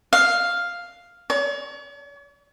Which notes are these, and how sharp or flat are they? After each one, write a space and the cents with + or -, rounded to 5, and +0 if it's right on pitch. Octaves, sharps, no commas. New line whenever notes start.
F5 +0
C#5 +45